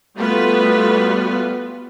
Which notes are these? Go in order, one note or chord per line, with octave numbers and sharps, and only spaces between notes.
G3 A3 B3 F4 F#4 B4